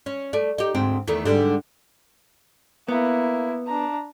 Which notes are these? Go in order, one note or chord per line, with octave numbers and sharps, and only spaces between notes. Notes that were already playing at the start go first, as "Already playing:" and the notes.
C#4
A3 D5
D#4 G4
D2 G#2 C4
E2 D#3 A3
G#2 D3 G3
A#3 B3 E4
D4 A#5